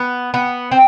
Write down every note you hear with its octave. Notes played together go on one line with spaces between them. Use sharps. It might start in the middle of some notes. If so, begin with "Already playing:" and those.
Already playing: B3
B3
C4